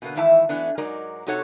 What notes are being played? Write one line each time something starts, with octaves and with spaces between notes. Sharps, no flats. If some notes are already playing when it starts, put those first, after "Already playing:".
B2 D3 A#3 B3
G#2 D#3 E3 E4 E5 A5
E3 A3 B3 D4
G#2 F#3 G#3 D#4 A#4 D5
C3 D#4 F#4 A4 C#5 F#5